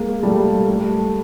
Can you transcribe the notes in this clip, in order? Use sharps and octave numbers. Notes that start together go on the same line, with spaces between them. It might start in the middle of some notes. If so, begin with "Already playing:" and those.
Already playing: G#3 A#3
G3 A3
G3 A3